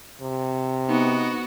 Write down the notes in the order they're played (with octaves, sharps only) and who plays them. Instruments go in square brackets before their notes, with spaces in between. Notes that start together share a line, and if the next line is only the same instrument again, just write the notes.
[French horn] C3
[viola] B3 F#4 [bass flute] D#4